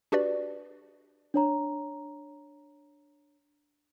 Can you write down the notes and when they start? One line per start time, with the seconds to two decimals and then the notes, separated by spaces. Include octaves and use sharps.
0.12 D4 F#4 G4 B4 D5
1.34 D4 C#5 A#5